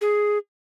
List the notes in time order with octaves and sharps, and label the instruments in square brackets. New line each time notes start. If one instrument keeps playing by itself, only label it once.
[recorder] G#4